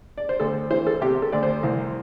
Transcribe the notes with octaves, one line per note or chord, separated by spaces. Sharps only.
D5
C5
D2 A4
E3 C5
A4
C3 G4
A4
D2 D5
C5
C2